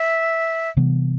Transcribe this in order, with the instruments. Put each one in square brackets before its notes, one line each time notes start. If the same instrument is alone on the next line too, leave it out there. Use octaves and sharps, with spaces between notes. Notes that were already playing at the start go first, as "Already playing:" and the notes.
Already playing: [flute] E5
[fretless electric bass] C3 E3 G3 B3